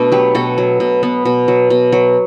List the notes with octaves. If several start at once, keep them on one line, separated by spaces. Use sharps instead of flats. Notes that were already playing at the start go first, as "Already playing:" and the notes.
Already playing: B2 A3 B3 D4 A4
F#3 G4 B4
B2 F#4 A4
F#3
B2
B3
B2
F#3
B2
F#3